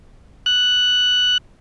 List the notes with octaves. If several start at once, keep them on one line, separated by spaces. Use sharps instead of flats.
F#6